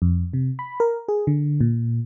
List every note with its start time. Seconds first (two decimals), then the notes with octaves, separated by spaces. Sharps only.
0.02 F2
0.33 C3
0.59 B5
0.80 A#4
1.08 G#4
1.27 D3
1.61 A#2